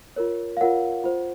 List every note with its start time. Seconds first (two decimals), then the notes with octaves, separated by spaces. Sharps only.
0.16 F4 A#4 C#5
0.57 F5
0.61 F4 A#4 C#5 F#5
1.04 F4 C5